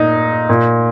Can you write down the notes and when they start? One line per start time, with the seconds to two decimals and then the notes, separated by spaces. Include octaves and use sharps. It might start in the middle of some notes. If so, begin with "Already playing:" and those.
Already playing: A#2 D#4
0.49 A#2